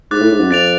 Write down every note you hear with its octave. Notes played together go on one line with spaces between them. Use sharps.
G#2 D6 F#6 A6
A2
G#2
F#2
F2 A6 D7 F7